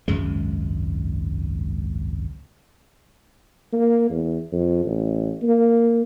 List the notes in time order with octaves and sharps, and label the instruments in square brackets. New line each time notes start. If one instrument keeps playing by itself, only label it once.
[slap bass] G#1 C#2 F#2 G#3
[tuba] A#3
E2
F2
A1
A#3